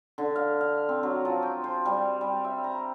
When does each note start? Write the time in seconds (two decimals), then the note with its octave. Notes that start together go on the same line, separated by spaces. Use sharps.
0.18 D3
0.36 F5
0.61 F5
0.89 C4
1.03 F#3
1.25 F3
1.43 G5
1.64 C5
1.85 G3
2.21 G3
2.44 E5
2.64 A#5